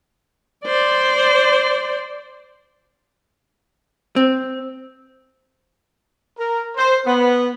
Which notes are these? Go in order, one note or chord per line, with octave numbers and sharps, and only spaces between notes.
C5 D5
C4
A#4
C5
B3